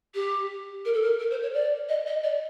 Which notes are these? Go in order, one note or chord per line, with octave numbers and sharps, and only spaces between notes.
G4
A#4
A4
A#4
A#4
C5
C#5
D5
D#5
D#5
D5